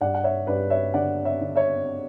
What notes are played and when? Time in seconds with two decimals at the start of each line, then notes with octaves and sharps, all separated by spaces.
0.01 G2 D5 F#5
0.15 F#5
0.24 C#5 E5
0.47 G2 B4 D5
0.70 C#5 E5
0.94 D3 D5 F#5
1.24 C#5 E5
1.41 D3
1.55 C#5 E5